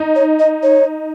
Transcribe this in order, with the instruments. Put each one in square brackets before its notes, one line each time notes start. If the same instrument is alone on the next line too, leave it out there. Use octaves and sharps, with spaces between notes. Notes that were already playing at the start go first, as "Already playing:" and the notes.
Already playing: [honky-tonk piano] D#4
[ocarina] C#5
D#5
C#5